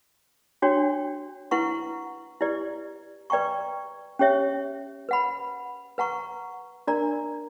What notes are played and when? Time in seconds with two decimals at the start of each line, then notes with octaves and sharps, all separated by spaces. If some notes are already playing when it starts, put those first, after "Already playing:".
0.62 D4 F#4 C#5 G5
1.51 E4 B4 F#5 A#5 C#6
2.41 E4 G4 B4 D5
3.30 B4 D5 G5 A#5 C#6
4.19 C#4 G4 C#5 E5
5.09 B4 F#5 B5
5.98 B4 F#5 A#5 C#6
6.87 D4 A#4 D5 A#5